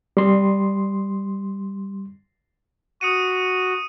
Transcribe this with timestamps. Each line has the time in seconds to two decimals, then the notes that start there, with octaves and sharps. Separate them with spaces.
0.17 G3 C6
3.01 F#4 D#6 C#7 D#7